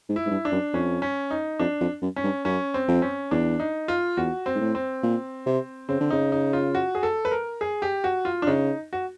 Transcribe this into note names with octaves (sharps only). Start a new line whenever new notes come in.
G#2
E4
G#2
G2
D4
F#2
F2 C#4
C#4
D#4
F2 D4
F2
F#2
C#4
G2
F#2 C#4
C4
F2
C#4
E2 D4
D#4
F4
E2 F#4
C4
G#2
A2
C4
A#2
C3
C#3 C4
D3
C#3 D#4
D#4
F4
F#4
G#4
A4
B4
A#4
G#4
G4
F#4
F4
D4
C#3 D#4
F#4